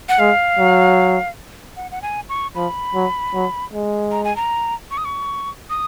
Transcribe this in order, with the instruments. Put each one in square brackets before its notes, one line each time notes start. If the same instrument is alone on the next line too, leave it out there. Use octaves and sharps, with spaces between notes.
[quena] F#5
[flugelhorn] G#3 [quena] F5
[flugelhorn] F#3
[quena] F#5
F#5
G#5
C#6
[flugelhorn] F3 [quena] B5
[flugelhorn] F#3
F#3
G#3
[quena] A#5
G#5
A#5
C#6
D#6
C#6
D#6